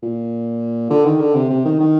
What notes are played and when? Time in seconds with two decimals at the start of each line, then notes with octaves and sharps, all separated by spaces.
0.03 A#2
0.90 D3
1.05 D#3
1.21 D3
1.35 C3
1.50 C3
1.65 D#3
1.80 D#3